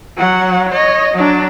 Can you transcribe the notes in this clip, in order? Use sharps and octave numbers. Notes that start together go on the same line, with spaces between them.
F#3 F#5
C#5 D#5
F#3 D4